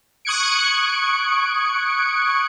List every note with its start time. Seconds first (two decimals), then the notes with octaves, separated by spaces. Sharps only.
0.25 C#6 D#6 F#6 G#6 C#7 D7